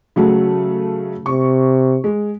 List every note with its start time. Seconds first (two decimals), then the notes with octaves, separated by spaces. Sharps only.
0.16 C#3 F#3 A3
1.26 C3 C#6
2.04 G#3